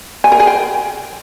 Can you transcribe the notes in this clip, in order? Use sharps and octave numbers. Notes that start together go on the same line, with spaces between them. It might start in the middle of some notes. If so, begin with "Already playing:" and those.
G#5
A#4
G#4
G5